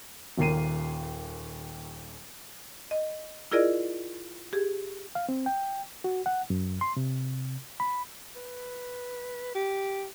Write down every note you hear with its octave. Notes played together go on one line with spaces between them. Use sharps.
D#1 D#2 A#3 C7 D#7
D#5
E4 F4 G#4 A#4 D5 D#5
G4 G#4
F5
C4
G5
F#4
F#5
F#2
C6
C3
B5
B4
G4